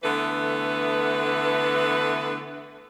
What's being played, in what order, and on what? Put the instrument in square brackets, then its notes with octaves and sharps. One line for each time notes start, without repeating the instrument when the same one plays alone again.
[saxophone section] D3 E3 A3 B3 B4